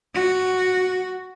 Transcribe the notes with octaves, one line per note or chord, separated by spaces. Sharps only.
F#4